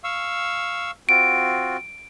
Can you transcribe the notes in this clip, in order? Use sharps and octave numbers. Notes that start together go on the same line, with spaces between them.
F5 C#6 E6
C4 F4 F#4 D7